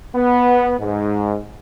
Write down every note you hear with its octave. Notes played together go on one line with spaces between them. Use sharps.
B3
G#2